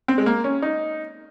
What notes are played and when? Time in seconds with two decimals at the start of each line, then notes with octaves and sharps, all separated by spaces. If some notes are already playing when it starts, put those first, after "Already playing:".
0.08 C4
0.18 G#3
0.26 A#3
0.44 C#4
0.62 D#4